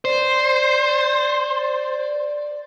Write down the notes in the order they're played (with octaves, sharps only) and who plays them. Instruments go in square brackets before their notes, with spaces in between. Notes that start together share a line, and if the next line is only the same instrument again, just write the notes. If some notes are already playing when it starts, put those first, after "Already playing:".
[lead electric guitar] C5 [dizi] D5